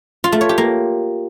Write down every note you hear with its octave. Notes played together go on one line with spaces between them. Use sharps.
F4
A3
C#5
G4
A#3